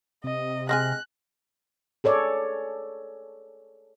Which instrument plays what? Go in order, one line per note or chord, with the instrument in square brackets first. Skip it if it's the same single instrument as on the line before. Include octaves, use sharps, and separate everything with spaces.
[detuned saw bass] C3 [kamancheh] D#5
[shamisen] G#3 C4 G#4 [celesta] G#5 F6 A#6 [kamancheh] F#6
[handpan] G#4 A4 C#5 D5